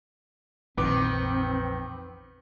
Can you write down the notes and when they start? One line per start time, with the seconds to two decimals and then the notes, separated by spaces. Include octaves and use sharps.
0.77 A#1 F2 D#3 E3 B3 C4 B4 D6